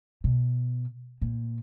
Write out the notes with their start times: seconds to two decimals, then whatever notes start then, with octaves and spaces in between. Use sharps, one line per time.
0.24 B2
1.21 A#2